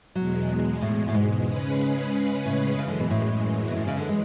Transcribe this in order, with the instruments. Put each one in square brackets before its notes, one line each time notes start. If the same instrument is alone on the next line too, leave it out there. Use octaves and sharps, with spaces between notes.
[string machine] E2 B2 G#3 [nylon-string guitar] F#3
[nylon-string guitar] A2
A2
G#2
[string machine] C#3 G#3 C#4 G#4 B4
[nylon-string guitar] A2
[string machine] F#2 E3 G#3 [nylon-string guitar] C#3
[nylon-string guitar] D3
B2
A2
B2
A2
C#3
D3
G#3